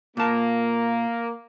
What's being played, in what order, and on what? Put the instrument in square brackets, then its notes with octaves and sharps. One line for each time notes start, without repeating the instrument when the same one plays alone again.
[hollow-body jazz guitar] A#2 A5 [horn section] A#3